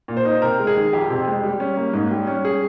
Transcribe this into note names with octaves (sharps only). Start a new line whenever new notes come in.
A#2
C5
D#4
C3 A#4
G#3
G#4
D#3
F2 G4
C3
G#3
G3
C#4
A#3
G#2
G3
C#4
G#4